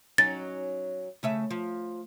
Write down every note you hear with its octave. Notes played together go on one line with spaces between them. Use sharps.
F#3 C#4 D#4 A6
C#3 A3 E5
F3